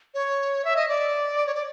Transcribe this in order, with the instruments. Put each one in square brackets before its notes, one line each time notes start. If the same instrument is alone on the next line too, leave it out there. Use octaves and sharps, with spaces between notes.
[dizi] C#5
E5
D#5
D5
C#5
D5